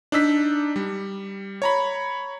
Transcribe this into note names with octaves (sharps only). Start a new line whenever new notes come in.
D4 D#4 E6 B6
G3
C#5 A#5 B5